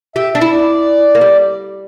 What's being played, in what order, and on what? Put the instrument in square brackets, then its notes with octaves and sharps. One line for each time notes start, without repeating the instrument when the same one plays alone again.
[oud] G4 [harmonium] E5
[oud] D4 [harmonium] E5
[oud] E4
[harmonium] D5
[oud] A#3
G3